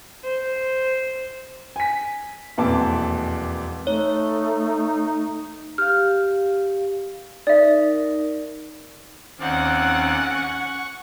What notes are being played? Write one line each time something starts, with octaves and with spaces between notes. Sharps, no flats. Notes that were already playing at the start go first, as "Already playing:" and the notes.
C5
G#5 B6
E1 F2 A#2 E3 A5 D6
A3 D#4 C#5
G4 F5 F6
D#4 A#4 D5 E5
D#2 C4 C#4 D5 F#5
C#6